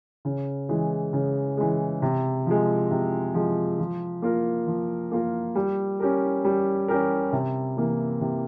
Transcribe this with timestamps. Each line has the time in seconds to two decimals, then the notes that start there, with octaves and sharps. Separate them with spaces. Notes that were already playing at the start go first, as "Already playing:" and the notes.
0.25 C#3
0.69 E3 G#3
1.13 C#3
1.57 E3 G#3
2.02 C3
2.46 F3 G#3
2.91 C3
3.34 F3 G#3
3.79 F3
4.22 A#3 F4 A#4
4.67 F3
5.12 A#3 F4 A#4
5.55 G3
6.00 C#4 G4 A#4
6.45 G3
6.88 C#4 G4 A#4
7.32 C3
7.77 E3 A#3
8.21 C3